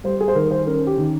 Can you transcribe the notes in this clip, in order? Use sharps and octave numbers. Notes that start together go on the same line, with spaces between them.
G3 C5
G#4
C5
D#3 A#4
C5
C#4 A#4
G4
D#3